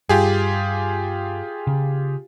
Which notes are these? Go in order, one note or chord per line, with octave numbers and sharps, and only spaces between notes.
G2 F4 G4 G#4
C#3